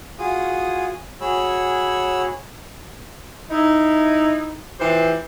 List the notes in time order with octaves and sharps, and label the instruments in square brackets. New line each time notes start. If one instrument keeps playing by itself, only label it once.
[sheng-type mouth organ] F4 F#4 G#4 D#6
F#4 G#4 C#5 B5 E6
[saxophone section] D#4 E4
E3 F3 G4 C5